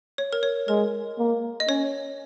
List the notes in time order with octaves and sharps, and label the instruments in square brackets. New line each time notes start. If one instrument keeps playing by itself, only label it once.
[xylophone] C#5
A#4
C#5
[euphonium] G#3 [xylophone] A#4
[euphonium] A#3
[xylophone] D#5
[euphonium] C#4 [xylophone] C#5